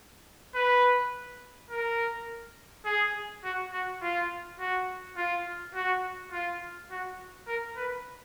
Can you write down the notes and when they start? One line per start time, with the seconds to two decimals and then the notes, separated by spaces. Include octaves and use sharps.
0.55 B4
1.71 A#4
2.86 G#4
3.44 F#4
3.73 F#4
4.02 F4
4.60 F#4
5.17 F4
5.74 F#4
6.32 F4
6.91 F#4
7.48 A#4
7.76 B4